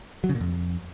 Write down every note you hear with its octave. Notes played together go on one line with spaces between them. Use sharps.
F#3
C#3
A#2
F2